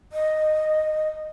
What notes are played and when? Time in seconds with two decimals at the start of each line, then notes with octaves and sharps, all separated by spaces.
0.12 D#5